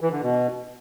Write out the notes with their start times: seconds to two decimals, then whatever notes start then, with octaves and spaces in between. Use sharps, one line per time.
0.01 E3
0.12 D3
0.22 B2